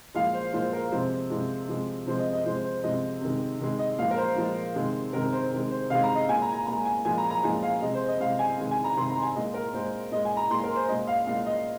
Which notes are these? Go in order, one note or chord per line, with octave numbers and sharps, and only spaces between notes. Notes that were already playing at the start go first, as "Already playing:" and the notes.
A#2 F3 G#3 F5
C5
A#2 F3 G#3 C5
A#4
C3 F3 G#3 C5
C3 F3 G#3
C3 F3 G#3
C3 F3 G#3 C5
D#5
D#5
C3 F3 G#3 C5
C5
C3 F3 G#3 D#5
C3 D#3 G#3
C3 D#3 G#3
D#5
A#2 F3 G#3 F5
A#4
C5
A#2 F3 G#3
C3 D#3 G#3
C3 D#3 G#3 A#4
C5
C3 D#3 G#3
C5
C3 D#3 G#3 F5
A#5
D#5
A#2 G#3 G#5
A#5
A#5
A#2 G#3 A#5
G#5
A#2 F3 G#3 G#5
A#5
A#5
A#2 F3 G#3 G#5
F5
C3 G#3 D#5
C5
D#5
C3 G#3 F5
G#5
C3 D#3 G#3
G#5
A#5
C3 D#3 G#3 C6
A#5
G#5
A#2 G#3 D#5
A#4
A#2 G#3 C5
A#2 G#3 D#5
G#5
A#5
A#2 G#3 C6
A#4
C5
A#2 G#3 D#5
F5
A#2 G#3 F5
D#5